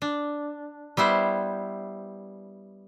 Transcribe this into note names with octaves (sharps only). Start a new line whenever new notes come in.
D4
G3 B3 E4 C5